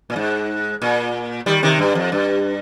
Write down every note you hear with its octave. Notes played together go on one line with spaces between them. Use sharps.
A#2
G#2
A#2
D#3 G3
C3 D#3
G2
F2
G2